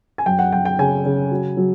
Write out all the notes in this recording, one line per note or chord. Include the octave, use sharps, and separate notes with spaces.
G#5
F#2 G5
F#5
F#2 G5
G5
C#3 G#5
C#3
F#3
F#3